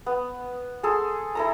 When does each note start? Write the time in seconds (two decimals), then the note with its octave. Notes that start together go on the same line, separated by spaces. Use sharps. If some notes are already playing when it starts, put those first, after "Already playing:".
0.06 B3
0.83 G#4 A4 C6
1.35 E4 A4 A#5